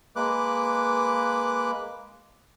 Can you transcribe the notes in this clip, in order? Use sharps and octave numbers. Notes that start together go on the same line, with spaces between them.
G#3 A#3 B4 D6 F#6